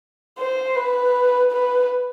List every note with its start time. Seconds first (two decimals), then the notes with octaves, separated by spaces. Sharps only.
0.38 C5
0.76 B4
1.52 B4